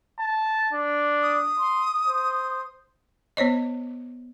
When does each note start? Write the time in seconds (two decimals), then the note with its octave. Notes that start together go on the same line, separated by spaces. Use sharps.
0.19 A5
0.73 D4
1.22 D#6
1.59 C6
2.08 C5
3.37 B3 C5 C#5 D#5